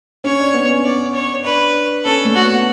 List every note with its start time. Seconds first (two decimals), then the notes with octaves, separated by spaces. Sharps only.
0.24 C#4 C#5
0.40 D4
0.54 B3
0.69 C#4
0.84 C#4 D5
1.15 C#5
1.44 D4 B4
2.05 C#4 A4
2.25 A3
2.35 F#4
2.45 B3